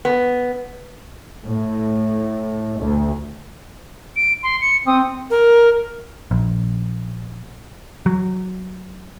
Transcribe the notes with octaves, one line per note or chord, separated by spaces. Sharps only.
B3
A2
D2
D7
C6
C#7
C4 D#6
A#4
A#1
F#3